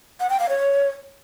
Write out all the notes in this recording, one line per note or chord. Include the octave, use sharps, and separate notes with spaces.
F#5
G5
F5
C#5